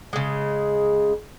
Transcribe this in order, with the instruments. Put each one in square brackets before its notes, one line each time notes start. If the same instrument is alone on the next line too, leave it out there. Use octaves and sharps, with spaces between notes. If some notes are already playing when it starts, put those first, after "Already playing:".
[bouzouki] C#3 G#3